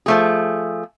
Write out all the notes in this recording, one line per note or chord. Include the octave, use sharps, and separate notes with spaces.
F3 A3 G#4